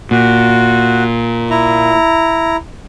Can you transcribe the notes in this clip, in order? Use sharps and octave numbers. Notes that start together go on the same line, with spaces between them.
A#2 F#4
E4 A#5